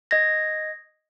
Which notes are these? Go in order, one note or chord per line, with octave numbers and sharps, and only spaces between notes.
D#5 G#6 A#6